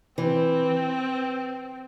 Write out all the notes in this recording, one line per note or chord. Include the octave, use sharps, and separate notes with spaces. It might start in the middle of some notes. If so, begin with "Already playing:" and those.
E3 C4